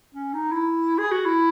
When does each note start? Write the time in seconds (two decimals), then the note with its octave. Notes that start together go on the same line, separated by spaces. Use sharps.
0.15 C#4
0.34 D#4
0.52 E4
0.98 G#4
1.11 F#4
1.25 E4